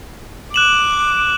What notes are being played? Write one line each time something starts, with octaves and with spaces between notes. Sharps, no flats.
D6 F#6 E7 F#7